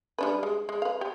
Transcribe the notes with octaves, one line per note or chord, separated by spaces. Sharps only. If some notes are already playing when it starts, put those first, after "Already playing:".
G3 D4 B4
G#3
G#3
B4 F5
G4